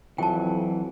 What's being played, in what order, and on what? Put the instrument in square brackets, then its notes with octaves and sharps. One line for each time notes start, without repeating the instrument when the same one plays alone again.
[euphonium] F2 [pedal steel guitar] E3 F#3 [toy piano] G5 A5